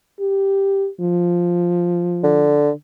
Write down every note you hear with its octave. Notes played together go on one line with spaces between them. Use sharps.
G4
F3
D3